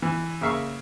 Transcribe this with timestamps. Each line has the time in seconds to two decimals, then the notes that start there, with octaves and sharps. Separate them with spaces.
0.02 E3
0.41 C#3 A#3 E5 F5 C#6